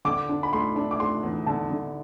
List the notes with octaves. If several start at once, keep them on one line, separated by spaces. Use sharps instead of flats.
D3 D6
D4
B5
A3 C6
D4
D6
A3 C6
E2
D3 A5
D3